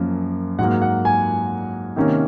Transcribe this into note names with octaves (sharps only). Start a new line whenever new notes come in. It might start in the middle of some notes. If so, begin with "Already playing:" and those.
Already playing: F#2 F3 A#3 C#4
G#2 F#3 A#3 F#5
F#5
G#5
C3 D#3 A#3 C#4